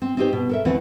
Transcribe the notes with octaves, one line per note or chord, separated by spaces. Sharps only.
C4
C4 C#4 D#4 F#4 G4 C5
B2
A4 A#4 E5
D#2 E3 A3 C4 F#5